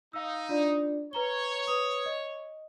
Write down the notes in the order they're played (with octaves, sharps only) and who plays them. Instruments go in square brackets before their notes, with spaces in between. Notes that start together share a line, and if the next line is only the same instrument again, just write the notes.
[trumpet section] D#4 [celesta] F5 E6
[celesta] D4 F4 D5
[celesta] B4 A#5 G7 [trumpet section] C#5
[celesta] B4 D#6
D#5